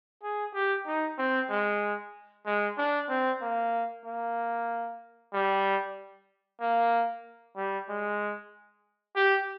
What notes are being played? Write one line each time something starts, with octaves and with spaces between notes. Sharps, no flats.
G#4
G4
D#4
C4
G#3
G#3
D4
C4
A#3
A#3
G3
A#3
G3
G#3
G4